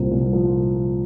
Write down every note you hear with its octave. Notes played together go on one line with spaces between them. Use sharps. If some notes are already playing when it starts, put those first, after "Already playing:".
Already playing: C2 A#2 F3 C4
C2
F3